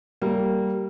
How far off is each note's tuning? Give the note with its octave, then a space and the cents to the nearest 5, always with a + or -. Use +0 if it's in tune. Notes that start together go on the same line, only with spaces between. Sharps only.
G3 -25 A#3 -20